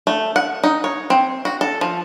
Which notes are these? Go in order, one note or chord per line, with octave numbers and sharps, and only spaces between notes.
A3
F#5
D#4
C#5
C4
F#4
A4
F3